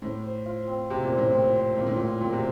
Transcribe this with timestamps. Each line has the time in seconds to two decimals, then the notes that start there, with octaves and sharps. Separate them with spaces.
0.02 A2 C5
0.24 C5
0.46 F4
0.67 C4
0.90 C3 C4
1.03 A#2
1.12 C4
1.18 A2
1.31 A#2 C4
1.56 C5
1.77 A#2 F4
1.87 A2
1.96 A#2 F4
2.21 A#2 C4
2.33 C3